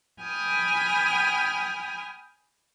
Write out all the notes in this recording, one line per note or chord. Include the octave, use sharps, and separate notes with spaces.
G5 G#5 B5 D#6 F6